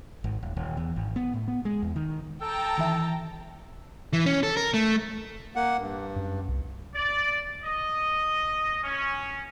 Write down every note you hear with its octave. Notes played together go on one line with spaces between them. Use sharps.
G#1
D#1
D#1
E2
G#1
B3
A2
B3
G#3
E2
D#3
A4 G5 A5 A#5
D#3 E3 E5
E3
C#4
A4
A#4
A3
A#3 F#5
G2
F#2
C2
D5
D#5
C#4